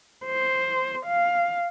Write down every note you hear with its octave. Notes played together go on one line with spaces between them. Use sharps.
C5
F5